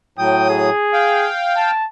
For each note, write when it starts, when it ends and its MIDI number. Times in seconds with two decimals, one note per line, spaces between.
0.18 0.70 45
0.18 0.70 54
0.18 0.45 79
0.18 0.70 87
0.50 1.30 68
0.93 1.71 77
0.93 1.71 79
1.57 1.87 81